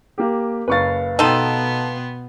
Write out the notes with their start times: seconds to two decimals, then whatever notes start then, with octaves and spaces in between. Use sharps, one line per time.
0.18 A#3 G4
0.68 F#1 B4 F5 C#6 A6
1.19 B2 B3 D#4 A4 G5 C6